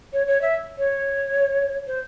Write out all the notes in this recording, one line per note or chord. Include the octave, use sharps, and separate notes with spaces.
C#5
C#5
E5
C#5
C5